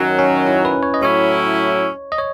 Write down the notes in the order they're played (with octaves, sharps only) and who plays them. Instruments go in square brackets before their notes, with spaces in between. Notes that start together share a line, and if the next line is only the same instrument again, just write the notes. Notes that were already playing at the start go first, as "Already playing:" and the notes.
Already playing: [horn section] F#2 D#3 F#3 [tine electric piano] C#4
[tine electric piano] C#4
E4
B4
C#5
D#5
[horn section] A2 F#3 C#4 E4 [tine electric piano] C#5
[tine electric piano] D#5
C#5